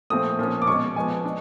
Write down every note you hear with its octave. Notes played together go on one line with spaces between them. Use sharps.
A#2 F3 A3 C4 D#6
A#2 F3 A#3 C#4
D6
B2 G#3 C#4 C#6
F3 G#3 B3 G#5
D4